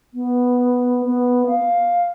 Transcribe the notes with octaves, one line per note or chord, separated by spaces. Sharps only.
B3
B3
F5